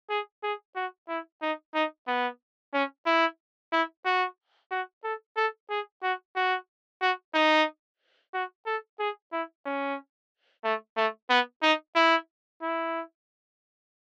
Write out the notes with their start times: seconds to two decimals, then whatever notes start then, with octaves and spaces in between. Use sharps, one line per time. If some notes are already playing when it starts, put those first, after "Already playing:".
0.10 G#4
0.43 G#4
0.76 F#4
1.09 E4
1.42 D#4
1.75 D#4
2.08 B3
2.74 C#4
3.06 E4
3.73 E4
4.05 F#4
4.71 F#4
5.04 A4
5.37 A4
5.70 G#4
6.03 F#4
6.36 F#4
7.02 F#4
7.34 D#4
8.34 F#4
8.66 A4
8.99 G#4
9.32 E4
9.66 C#4
10.64 A3
10.97 A3
11.30 B3
11.63 D#4
11.96 E4
12.62 E4